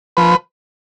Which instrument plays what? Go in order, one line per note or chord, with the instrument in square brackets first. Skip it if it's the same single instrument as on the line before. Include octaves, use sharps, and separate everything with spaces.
[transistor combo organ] F3 B4